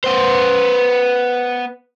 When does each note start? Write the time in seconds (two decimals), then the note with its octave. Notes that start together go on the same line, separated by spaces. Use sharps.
0.04 B3 C5